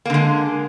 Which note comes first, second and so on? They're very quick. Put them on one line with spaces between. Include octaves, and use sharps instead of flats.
A#3 D3 G#3